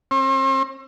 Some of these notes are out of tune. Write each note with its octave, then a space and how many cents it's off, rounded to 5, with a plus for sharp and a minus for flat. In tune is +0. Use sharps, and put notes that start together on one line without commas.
C4 +40